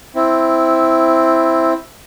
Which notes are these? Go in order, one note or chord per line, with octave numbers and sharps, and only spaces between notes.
C4 E4